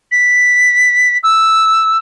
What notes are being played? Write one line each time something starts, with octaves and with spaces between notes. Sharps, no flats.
B6
E6